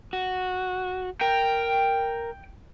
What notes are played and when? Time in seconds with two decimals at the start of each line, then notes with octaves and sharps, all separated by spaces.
0.13 F#4
1.21 A#4 G5